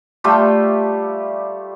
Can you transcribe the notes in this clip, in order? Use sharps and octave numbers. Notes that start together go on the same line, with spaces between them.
G3 A3 F4 G4